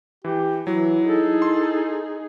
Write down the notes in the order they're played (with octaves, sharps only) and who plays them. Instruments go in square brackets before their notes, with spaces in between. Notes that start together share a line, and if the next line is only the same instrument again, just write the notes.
[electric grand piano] E3 [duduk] G4
[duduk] E3 [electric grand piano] F#3 [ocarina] E4
[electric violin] D#4 G#4 [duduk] A4
[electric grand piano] C6